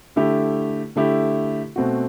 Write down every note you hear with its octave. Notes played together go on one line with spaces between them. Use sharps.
D3 A3 E4 G4
D3 A3 E4 G4
B2 A3 C4 F#4